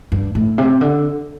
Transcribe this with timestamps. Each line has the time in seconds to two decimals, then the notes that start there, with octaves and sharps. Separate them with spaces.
0.12 G2
0.35 A2
0.58 C3
0.81 D3